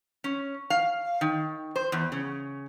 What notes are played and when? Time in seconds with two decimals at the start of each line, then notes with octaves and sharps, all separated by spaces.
0.24 C#4
0.70 F5
1.21 D#3
1.76 C5
1.92 E2
2.12 C#3